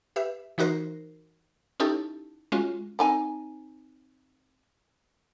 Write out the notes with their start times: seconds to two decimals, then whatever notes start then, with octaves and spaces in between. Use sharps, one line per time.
0.16 G4 B4 E5
0.58 E3 D#4 F#4 A#4 C5 C7
1.80 C#4 D#4 E4 G4 A4 A5
2.52 G#3 C#4 F4 F#4
2.99 C4 D#4 G#5